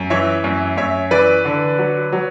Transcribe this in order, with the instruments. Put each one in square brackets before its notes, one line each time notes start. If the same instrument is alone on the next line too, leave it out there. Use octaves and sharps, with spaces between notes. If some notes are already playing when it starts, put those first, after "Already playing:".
Already playing: [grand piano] F#2
E3 C#5 E5
F#2
F#2 C#5 E5
E3 B4 D5
D3
F#3
F#3